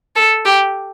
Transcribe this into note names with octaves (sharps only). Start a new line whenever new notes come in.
A4
G4